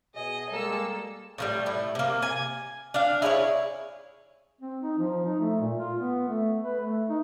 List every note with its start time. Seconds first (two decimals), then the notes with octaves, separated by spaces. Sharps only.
0.14 B2 G#4 D#5
0.51 G3 G#3 A#3 A4 E6
1.38 A2 F3 G3
1.66 A2 E4
1.95 C3 A#3
2.22 G#5
2.94 D4 F5
3.22 E4 G#4 B4 C#5
4.61 C4
4.83 D#4
4.98 F3
5.26 D#4
5.39 A3
5.60 A#2
5.78 F4
5.98 B3
6.29 A3
6.64 B4
6.81 A3
7.09 D#4